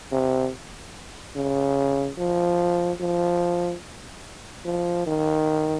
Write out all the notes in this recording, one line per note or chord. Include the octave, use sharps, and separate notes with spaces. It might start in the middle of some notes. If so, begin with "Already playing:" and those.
C3
C#3
F3
F3
F3
D#3